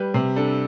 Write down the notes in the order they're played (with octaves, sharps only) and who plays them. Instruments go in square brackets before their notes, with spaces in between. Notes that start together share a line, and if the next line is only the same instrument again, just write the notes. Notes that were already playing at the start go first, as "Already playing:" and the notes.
Already playing: [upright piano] G3 B4
C3
D4 A4